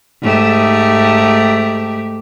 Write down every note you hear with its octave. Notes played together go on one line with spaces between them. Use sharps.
G#2 A3 G4